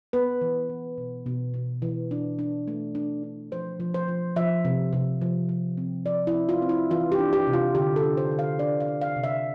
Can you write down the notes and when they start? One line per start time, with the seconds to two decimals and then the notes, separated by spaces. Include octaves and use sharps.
0.13 B3 B4
0.41 E3
0.69 E3
0.98 B2
1.26 B2
1.54 B2
1.82 E3
2.11 D4
2.39 D4
2.68 A3
2.95 D4
3.23 D4
3.52 F3 C5
3.80 F3
3.94 C5
4.08 F3
4.36 F3 E5
4.65 C3
4.93 C3
5.22 F3
5.49 F3
5.77 C4
6.06 F3 D5
6.27 E4
6.34 C4
6.49 F4
6.62 C4
6.69 E4
6.91 E3 F4
7.12 G4
7.19 D4
7.33 G4
7.47 C3
7.53 F4
7.75 D3 G4
7.96 A4
8.03 D4
8.17 C5
8.31 D3
8.39 F5
8.59 D4 D5
8.80 F5
8.88 D4
9.01 F5
9.16 C3
9.24 E5